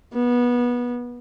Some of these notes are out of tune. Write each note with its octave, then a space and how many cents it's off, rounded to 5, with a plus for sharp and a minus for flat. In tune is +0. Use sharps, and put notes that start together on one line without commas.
B3 -20